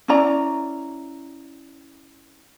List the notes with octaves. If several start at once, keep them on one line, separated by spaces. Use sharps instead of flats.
C#4 E4 D5 A#5